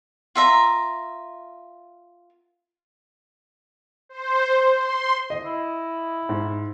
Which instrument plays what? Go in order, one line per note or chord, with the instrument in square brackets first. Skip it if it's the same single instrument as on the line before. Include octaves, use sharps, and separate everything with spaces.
[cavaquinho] F4 E5 A#5
[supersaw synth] C5
C6
[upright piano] D#5
[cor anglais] E4
[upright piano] G#2